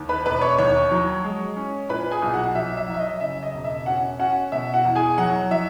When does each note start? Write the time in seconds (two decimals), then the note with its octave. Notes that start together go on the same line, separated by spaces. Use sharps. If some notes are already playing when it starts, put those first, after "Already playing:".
Already playing: D#2
0.09 B4 B5
0.25 E1 B4 B5
0.41 C#5 C#6
0.58 D#2 C#5 C#6
0.91 F#3
1.24 G#3
1.56 C#4
1.89 A#2 B4 B5
2.11 G#4 G#5
2.22 B1
2.33 F#4 F#5
2.55 F#3 E5
2.77 E5
2.88 F#3
2.94 E5
2.99 D#5
3.20 C#3 E5
3.43 D#5
3.53 E1
3.64 E5
3.86 C#4 F#4 F#5
4.19 C#4 F#4 F#5
4.52 B2 E5
4.74 F#4 F#5
4.85 E2
4.95 G#4 G#5
5.18 F#3 F#4 F#5
5.51 F#3 E5